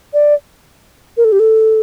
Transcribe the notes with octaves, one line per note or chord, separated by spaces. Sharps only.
D5
A#4
A4
G4
A4